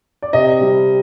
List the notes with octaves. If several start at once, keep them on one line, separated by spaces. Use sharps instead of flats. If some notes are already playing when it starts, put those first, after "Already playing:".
D5
C3 D#5
G3